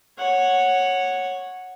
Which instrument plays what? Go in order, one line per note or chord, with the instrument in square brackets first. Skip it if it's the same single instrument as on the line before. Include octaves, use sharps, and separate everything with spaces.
[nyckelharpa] C#5 F#5